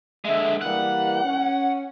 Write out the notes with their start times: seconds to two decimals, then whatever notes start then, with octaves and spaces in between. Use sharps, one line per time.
0.25 D3 G#3 E5
0.62 E3 G3 A#3 F#5
1.24 C#4